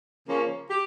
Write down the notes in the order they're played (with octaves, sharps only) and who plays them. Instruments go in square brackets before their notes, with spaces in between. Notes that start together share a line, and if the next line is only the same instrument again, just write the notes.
[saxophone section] C#3 F3 A#3 C#4
G4